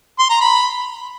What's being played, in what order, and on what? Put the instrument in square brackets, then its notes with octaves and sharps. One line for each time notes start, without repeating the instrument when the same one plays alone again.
[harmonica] C6
A#5
B5